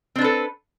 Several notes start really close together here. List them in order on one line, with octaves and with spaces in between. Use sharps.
C4 D4 B4 A4